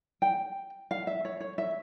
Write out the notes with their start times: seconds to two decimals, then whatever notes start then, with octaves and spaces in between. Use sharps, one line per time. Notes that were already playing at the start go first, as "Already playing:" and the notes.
0.22 G5
0.91 F5
1.07 E5
1.25 C#5
1.40 C#5
1.58 E5